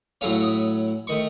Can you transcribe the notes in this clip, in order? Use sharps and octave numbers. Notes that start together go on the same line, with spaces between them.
A2 F#3 A3 C#4 F5
D#6
D#3 A3 C#6